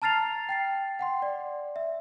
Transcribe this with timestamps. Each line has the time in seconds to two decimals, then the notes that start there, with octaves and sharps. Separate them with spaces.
0.02 A5 A#5 F6 A6 C7 F7
0.49 G5 A6 C7
0.99 F#5 G5 C6
1.22 D5
1.76 E5